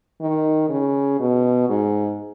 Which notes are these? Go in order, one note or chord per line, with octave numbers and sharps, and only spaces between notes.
D#3
C#3
B2
G#2